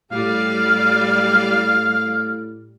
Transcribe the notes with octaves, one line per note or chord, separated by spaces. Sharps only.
A2 G3 D5 F5 F6